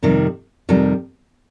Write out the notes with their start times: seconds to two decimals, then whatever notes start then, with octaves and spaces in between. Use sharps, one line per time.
0.03 F2 C3 D#3 G3
0.69 F2 C3 D#3 G3